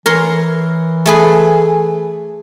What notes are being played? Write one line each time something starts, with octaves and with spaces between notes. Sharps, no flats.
E3 A#4 C#5 C6
A3 G#4 B4